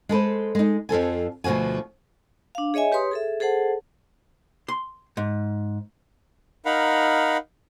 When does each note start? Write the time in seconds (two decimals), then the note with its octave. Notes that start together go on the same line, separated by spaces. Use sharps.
0.09 G#3 A4 B4 C5
0.55 G#3 D#4
0.89 F2 F3 A4 G#5
1.44 D2 B2 F3 F#4 G#5
2.55 D4 F5
2.74 G#4 C#5 D#5 E5 G#5
2.92 G4 B4 C#5 C6 D#6
3.11 G#4 A4 E5
3.40 G#4 A4 C5 F#5 A5
4.68 C6
5.17 G#2
6.66 D#4 A#4 F5 F#5 B5